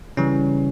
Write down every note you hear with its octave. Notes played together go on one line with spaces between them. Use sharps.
C#3 E3 G3 C#4